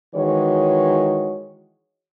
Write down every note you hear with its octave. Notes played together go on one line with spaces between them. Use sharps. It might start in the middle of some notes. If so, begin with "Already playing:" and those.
D#3 E3 G#3 F#4 C#5